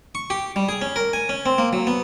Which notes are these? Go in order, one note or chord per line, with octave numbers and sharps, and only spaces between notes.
C#6
G4
G3
G#4
C#4
A#4
G#5
C#4
C4
A#3
F#3
B3